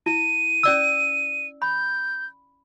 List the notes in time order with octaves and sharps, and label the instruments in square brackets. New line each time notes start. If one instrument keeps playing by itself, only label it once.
[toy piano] E4 [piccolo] D#7
[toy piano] C#4 D5 E6
[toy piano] B5 [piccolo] G6